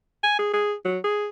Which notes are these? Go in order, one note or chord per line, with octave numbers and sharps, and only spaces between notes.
G#5
G#4
G#4
F#3
G#4